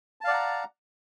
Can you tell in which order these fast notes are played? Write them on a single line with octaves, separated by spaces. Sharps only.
A5 F5 D5 F#5 A#5